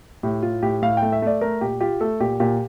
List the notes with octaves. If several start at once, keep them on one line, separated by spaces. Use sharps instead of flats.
A2 G4
A2 F4
A2 G4
A2 F5
G5
A3
E5
A3 D5
A3 A#4
A#2 G4
F4 G4
A3 A4
A#2 G4
A#2 G4